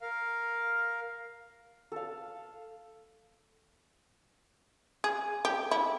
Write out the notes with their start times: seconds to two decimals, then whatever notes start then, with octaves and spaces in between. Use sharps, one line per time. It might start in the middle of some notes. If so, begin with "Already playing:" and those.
0.01 A#4 F5
1.92 A4 F5
5.04 G#4
5.45 G4
5.71 E4